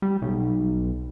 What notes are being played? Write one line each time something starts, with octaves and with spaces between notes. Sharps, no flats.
G3
B1